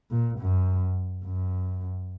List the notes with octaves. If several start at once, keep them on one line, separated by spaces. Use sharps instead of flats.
A#2
F#2
F#2